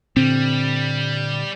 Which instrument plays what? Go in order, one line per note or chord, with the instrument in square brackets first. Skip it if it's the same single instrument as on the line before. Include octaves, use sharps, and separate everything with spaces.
[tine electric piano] A#2 D3 [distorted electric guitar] G3 [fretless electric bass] C4